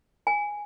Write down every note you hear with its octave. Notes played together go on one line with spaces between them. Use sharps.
G#5